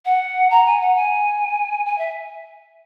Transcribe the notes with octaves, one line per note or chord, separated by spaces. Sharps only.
F#5
A#5
G#5
F#5
G#5
G#5
E5